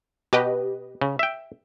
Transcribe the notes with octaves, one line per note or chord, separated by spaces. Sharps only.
B2 G4 B4 D#5
C#3
E5 G5